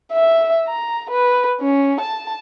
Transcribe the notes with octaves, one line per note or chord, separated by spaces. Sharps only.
E5
A#5
B4
C#4
A5